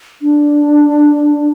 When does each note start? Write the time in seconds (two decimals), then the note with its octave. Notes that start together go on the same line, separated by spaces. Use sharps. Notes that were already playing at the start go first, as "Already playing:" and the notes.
0.22 D4